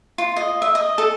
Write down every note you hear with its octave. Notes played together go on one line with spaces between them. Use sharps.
F4
D#5
E5
D#5
A4